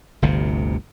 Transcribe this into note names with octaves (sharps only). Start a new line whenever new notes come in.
G1 D2 C3